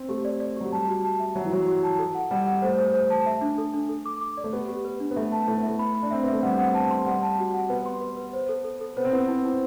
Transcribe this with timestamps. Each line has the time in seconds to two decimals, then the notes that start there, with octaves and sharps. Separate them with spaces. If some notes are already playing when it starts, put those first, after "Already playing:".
Already playing: C4
0.09 A3 G4
0.25 D5
0.40 D5
0.56 F#3 G4
0.72 G3 A5
0.88 F#4
1.04 A5
1.20 E5
1.35 F#3 E5
1.44 E3
1.52 F#3 F#4
1.67 F#4
1.83 A5
1.99 A4
2.15 F#5
2.31 G3 F#5
2.47 F#5
2.62 A3 C5
2.78 C5
2.94 C5
3.10 A5
3.26 E5
3.41 D4
3.58 A4
3.74 D4
3.89 A4
4.06 D6
4.21 D6
4.37 D5
4.44 A3
4.53 B3 G4
4.68 G4
4.85 B4
5.00 D4
5.11 B3
5.16 A3 E5
5.32 A5
5.47 A3 E4
5.57 B3
5.63 A3 E5
5.79 B5
5.95 B5
6.02 D4
6.11 C4 E5
6.23 B3 E5
6.33 A3
6.43 G3 F#5
6.58 F#5
6.74 A5
6.90 C6
7.06 G3 F#5
7.22 A5
7.38 F#4
7.54 F#5
7.69 B3 B4
7.86 C6
8.01 B4
8.17 B4
8.33 C5
8.49 A4
8.64 A4
8.81 A4
8.97 B3 C5
9.05 C4
9.12 B3 E4
9.28 E4
9.44 E4